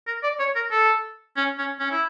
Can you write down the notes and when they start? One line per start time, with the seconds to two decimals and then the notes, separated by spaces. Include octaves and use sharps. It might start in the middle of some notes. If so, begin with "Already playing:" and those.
0.07 A#4
0.23 D5
0.39 C#5
0.55 A#4
0.71 A4
1.37 C#4
1.58 C#4
1.80 C#4
1.91 E4